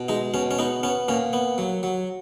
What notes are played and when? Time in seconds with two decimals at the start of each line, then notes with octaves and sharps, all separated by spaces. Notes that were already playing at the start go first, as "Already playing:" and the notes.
Already playing: B2
0.08 G#3 D#4
0.34 B2 C#4
0.51 C#4
0.59 B3 D#4
0.83 B3 C#4
1.08 A#2 C#4
1.33 B3
1.58 F#3
1.83 F#3